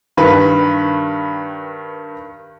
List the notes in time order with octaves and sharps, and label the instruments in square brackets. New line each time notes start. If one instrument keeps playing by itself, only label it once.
[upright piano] G2 D#3 B4